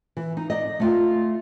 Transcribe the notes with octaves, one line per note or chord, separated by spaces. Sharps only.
E3
D#4
D5 D#5
A3 F4